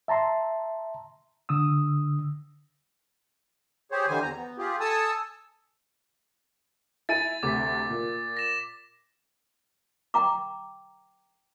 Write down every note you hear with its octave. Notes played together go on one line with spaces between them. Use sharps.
E5 A5 A#5 C6
D3 D#6 E6
G4 G#4 C5 C#5
D3 E3 G3 C5 G#5
E2 A#5
B3
F4 G4 G#4
A4 G#5 A5 D#6 E6
E4 G#5 A6 D#7
D2 C3 D6 B6
A#2
A#6 E7
G5 A#5 D6